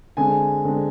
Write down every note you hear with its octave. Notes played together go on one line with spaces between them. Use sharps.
D3 G#3 C4 G#5
D3 G#3 C4